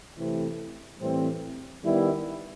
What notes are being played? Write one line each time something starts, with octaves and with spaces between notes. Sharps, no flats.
C3 E3 A3 C4 E4
A2 E3 G3 C4
D#3 G3 B3 E4